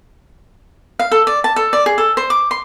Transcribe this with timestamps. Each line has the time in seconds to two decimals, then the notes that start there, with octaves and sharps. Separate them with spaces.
0.99 F5
1.11 A4
1.27 D5
1.44 A5
1.56 A4
1.73 D5
1.86 G#4
1.98 A4
2.17 C5
2.30 D6
2.51 C6